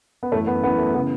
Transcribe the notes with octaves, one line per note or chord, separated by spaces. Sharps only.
B3
F#2 E3 A3 C#4
B3
F#2 E3 B3
A3
C#3 E3 B3